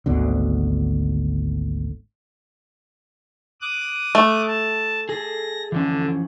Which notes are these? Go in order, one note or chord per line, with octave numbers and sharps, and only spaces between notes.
G#1 D2 B2 D3
D6 D#6 F#6
A3
A5
G#4 A4 A#6
D3 E3 F3 C#4